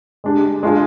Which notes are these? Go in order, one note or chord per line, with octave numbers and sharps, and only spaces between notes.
G#3 D4 G4
G#3 D4 F4 G#4